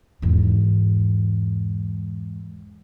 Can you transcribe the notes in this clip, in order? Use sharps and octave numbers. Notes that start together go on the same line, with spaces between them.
E2 G#2